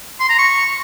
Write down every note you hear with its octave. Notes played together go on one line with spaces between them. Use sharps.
C6
A#5
C#6